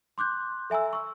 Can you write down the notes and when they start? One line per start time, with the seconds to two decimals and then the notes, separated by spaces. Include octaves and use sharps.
0.18 C6 D6 F#6 G6
0.70 A4 E5 G#5 A#5 E6
0.93 C#6 E6